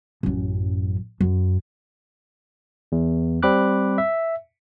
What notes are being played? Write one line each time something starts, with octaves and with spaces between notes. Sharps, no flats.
A1 F#2
F#2
E2
G3 C4 B5 D6 F#6
E5